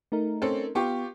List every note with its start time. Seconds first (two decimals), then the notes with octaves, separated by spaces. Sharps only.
0.12 A3 D#4 A#4
0.42 C4 C#4 A4
0.75 B3 F4 G4 C#6